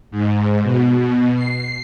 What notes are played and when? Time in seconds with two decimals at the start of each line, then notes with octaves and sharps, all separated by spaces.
0.11 G#2
0.63 B2
1.35 C7